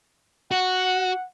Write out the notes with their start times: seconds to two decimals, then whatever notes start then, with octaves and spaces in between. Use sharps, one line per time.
0.51 F#4 F#5